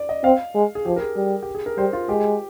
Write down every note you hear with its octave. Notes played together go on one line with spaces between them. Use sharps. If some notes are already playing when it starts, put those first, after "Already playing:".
Already playing: D5
D#5
C4 F5
G#3
G#4
F3 G4
A#4
G#4
G3
G4
G#4
A#4
G3 C5
F4
G#3 G4